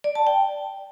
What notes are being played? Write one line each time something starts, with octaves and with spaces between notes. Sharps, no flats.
D5
A5
G5